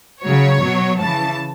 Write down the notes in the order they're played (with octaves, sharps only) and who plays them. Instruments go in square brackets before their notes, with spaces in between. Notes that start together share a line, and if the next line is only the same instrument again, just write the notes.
[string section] C#3 F#3 C#5
B2 F#3
C#3 E3 A5